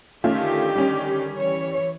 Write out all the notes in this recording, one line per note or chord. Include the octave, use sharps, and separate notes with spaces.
D3 D#3 A3 C#4 F4 G4
G3 C#4
E3 C#5